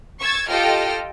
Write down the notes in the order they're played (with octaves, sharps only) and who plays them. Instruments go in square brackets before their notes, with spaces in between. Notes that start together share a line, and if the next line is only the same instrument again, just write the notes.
[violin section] C#6 E6 G#6 A6
F4 G4 A4 D#5 G5 F6